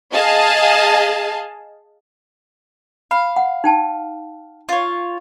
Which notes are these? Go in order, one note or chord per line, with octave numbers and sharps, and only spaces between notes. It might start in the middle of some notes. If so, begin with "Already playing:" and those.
G#4 D#5 F5 A5
F5 B5
F#5
D#4 G5 A5
F4 C#5